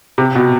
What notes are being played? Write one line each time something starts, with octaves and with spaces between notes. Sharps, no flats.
C3
B2